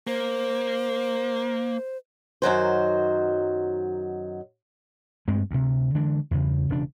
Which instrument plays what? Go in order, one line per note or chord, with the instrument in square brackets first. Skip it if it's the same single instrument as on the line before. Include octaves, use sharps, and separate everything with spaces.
[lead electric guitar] A#3 [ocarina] C5
[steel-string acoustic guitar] F#2 D#3 F#3 C5
[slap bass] G2 G#3 A3 C4
D2 C3
D3 E3 G#3 D4
E2 G2 C#3
E1 C#3 D4